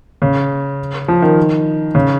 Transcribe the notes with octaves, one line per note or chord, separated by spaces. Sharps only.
C#3
F3
D#3
C#3